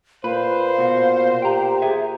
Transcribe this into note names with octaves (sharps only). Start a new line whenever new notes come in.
A#2 B4 C5 F5
B2 F#4
G4 G5 A#5
G#4 E5